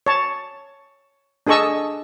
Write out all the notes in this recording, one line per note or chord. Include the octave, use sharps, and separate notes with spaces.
C#5 A5
D4 G#4 A4 D#5 C#6 E6